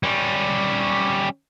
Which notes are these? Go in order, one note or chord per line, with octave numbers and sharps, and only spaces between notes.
G3 C#4